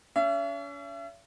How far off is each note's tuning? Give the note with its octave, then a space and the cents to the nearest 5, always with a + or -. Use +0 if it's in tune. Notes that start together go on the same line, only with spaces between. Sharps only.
C#4 +40 E5 +40